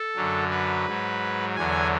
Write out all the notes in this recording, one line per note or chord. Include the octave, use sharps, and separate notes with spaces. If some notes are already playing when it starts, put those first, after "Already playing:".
Already playing: A4
F#2 D3 F#3
B4
G#2 F#3
E2 D3 F#3 G#5